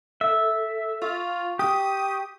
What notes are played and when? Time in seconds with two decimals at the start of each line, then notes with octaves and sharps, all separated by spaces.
0.21 A4 E5
1.02 F4 C#6
1.59 G4 D#6